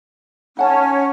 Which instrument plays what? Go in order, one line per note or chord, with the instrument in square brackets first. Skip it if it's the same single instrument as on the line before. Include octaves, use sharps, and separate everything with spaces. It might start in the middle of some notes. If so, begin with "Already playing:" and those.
[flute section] C#4 [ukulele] D#4 F#5 A5